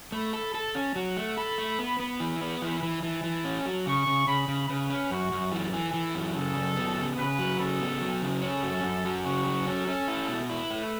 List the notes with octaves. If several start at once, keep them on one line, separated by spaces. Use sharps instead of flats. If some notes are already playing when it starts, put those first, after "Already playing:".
A3 B5
A4
A4 A5
C#4
F#3 F#5
A3
A4 B5
A3
B3
B3
E3 B5
B3
E3
E3
E3 A5
E3
C#4
F#3
C#3 C#6
C#3
C#3 B5
C#3
C#3 B4
C#4
F#2 F#4
F#2
E3 A4
E3
E3
F#2
C#3 A4
F#2
B3
C#3
C#3 B4
F#3
C#3 A4
B3
F#3
C#3
C#4 A4
F#2
F#2
F#3
C#3 F#4
F#3
C#4 A4
C#4
E4
B2
E4 B4
A3